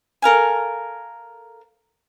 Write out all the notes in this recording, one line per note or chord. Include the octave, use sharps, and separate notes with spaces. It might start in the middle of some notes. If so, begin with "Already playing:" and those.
A4 A#4 F5 G#5